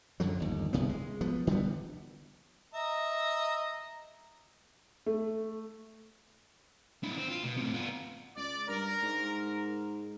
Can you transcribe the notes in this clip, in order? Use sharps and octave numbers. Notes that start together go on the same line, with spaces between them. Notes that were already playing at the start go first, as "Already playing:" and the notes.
F#2 D3 F3 F#3
G1 D#2
G1 C2 C3 B3
G#3
F3 B3
D3 G3 G#3 B3
D#5 E5 A#5
A3
D4 E4
C4
F4
B2
A2 C3
B3 F4
C#2 D5
G2 A#4
G#2